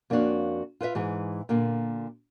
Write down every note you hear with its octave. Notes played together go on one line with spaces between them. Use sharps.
F2 A#3 C#4 D4 F#4 F5
F4 B4 C5 E5 F5
G#2 E3 G#4
A#2 D3 A#3